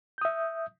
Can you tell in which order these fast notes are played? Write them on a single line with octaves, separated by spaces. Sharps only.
G6 D#6 E5